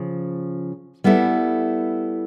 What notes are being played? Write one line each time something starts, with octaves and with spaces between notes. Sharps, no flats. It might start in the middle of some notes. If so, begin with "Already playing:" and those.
Already playing: C#3 F3
G3 B3 E4 A4